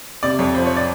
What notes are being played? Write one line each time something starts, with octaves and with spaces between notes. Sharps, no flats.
C3 D5
F2 C#5
F3 C5
C#5
D5